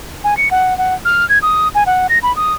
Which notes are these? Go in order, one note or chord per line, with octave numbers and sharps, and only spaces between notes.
G#5
C#7
F#5
F#5
F6
G#6
D#6
G#5
F#5
A#6
B5
D#6